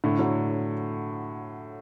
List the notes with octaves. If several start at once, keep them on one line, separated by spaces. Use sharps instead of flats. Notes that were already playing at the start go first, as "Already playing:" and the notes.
A2 D3
D3 F#3